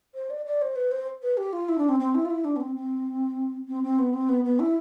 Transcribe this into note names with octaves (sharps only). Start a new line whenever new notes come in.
C5
D5
D5
C5
B4
C5
B4
G4
F4
E4
D4
C4
C4
E4
F4
E4
D4
B3
C4
C4
C4
C4
B3
C4
B3
B3
E4